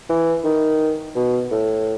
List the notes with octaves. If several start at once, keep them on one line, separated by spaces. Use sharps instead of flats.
E3
D#3
B2
A2